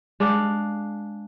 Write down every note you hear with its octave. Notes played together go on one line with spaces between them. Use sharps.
G#3 D4 D5 F5